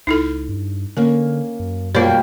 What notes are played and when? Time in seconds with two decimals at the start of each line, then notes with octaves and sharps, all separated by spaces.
0.07 C#2 D#4 E4 A4
0.49 G2
0.97 D3 A#3 C#4 A#4
1.60 F#2
1.95 B2 G3 A#3 F4 C#5